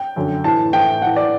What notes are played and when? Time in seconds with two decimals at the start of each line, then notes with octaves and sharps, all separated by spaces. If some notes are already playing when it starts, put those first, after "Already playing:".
Already playing: G5
0.16 F#2 D3
0.44 A2 E3 A5
0.73 A2 E3 G5
1.02 A2 E3 F#5
1.16 D5